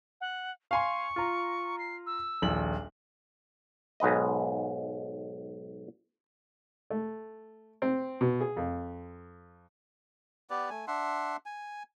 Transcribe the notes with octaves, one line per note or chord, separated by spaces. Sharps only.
F#5
F5 G#5 C6 C#6
F4 A#5
C7
E6
D#1 A#1 F#7
B1 G#2 B4 D#5
A3
C4
B2
G#4
F2
B3 G4 B4 D5
A3 G#5
D4 E5 F#5 C6
G#5